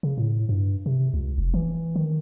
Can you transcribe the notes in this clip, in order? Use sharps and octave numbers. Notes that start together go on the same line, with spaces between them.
C#3
A2
G2
C3
C#2
F1
E3
D#3